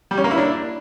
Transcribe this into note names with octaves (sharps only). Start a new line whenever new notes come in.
G3
C#4
A#3
E4
D4